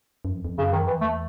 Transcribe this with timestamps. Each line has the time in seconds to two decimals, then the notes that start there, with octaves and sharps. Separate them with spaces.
0.25 F#2
0.30 F2
0.45 F2
0.58 F#2 C#3
0.72 D#3
0.87 F2 E3
1.01 E2 A3